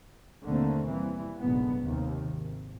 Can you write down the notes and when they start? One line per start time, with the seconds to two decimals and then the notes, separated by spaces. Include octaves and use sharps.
0.44 D#2 B2 D3 A3 A#3 C4
0.90 E3 G3
1.40 F#1 B1 G#2 D3 B3
1.83 D#2 C3 D#3
2.26 G#1